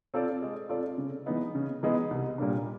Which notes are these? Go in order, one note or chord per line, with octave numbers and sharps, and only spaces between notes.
C4 F4 A4 D5
G#3
C4 F4 A4 D5
C#3
E3 G#3 B3 D#4
C#3
E3 G#3 B3 D#4
C2
A#2 G3 A#3 D4